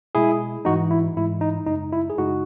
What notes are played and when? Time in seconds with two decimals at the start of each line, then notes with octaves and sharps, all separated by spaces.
0.15 B2 G#3 E4 G#4
0.65 G#2 E3 G#3 D#4 F#4
0.91 E4
1.17 G#2 E3 G#3 E4
1.41 D#4
1.66 F#2 C#3 G#3 D#4
1.93 E4
2.10 G#4
2.18 F#2 C#3 G#3 D#4 F#4